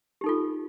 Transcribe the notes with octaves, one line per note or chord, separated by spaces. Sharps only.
D#4 F4 G4 A4